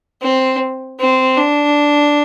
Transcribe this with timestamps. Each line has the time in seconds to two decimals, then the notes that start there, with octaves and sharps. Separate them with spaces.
0.22 C4
0.99 C4
1.37 D4